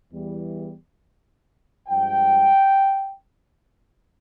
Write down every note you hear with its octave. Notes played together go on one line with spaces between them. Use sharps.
E2 E3 G3
G2 F3 G#3 G5